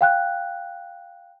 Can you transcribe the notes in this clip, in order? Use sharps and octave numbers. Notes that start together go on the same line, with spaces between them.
F5 G5 F#6